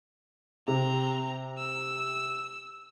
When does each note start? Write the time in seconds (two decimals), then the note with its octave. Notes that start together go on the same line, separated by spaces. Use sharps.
0.68 C3 C4 A#5
1.58 E6